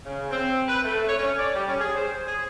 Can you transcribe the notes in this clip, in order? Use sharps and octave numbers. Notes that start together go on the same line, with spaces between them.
C#3
C4
B4
A3
C#5
C#4
D5
G3
C#4
G#4
C5
G#4